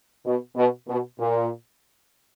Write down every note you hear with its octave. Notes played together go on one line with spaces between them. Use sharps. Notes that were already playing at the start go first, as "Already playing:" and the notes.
B2
B2
B2
A#2